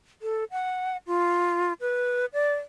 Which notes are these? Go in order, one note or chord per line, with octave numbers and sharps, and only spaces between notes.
A4
F#5
F4
B4
D5